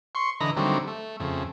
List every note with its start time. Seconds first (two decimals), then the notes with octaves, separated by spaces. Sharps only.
0.15 C6 C#6
0.40 D3 E3 D#5 A#5 B5
0.57 D3 D#3 F#3 G3 A3 C4
0.87 A3
1.20 F2 C#3 A3